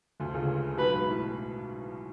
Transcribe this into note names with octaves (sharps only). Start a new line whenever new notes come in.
D2 D3
C#2 C#3
B1 B2 B4
G#2
A2